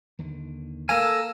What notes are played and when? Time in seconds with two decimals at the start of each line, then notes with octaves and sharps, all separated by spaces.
0.19 D#2 D3 D#3
0.89 A#3 A4 A#4 G#5 E6